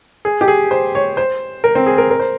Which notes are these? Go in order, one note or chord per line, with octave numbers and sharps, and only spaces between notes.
G#4
G4
G#4
C5
C#5
C5
A#4
C4
G#4
A#4
A#4
C5